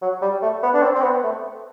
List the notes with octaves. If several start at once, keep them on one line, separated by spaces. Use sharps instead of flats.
F#3
G3
A3
B3
D4
C4
C4
B3
A3